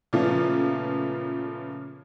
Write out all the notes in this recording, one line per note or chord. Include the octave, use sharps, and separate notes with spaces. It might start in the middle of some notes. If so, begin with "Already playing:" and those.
A#2 C#3 F3 A3 B3 F4